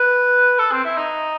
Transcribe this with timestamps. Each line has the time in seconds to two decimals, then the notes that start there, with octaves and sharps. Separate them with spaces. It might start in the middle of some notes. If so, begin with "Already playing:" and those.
Already playing: B4
0.59 A4
0.72 C4
0.85 E4
0.98 D#4